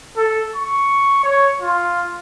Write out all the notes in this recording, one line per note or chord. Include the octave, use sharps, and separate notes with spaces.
A4
C#6
C#5
F4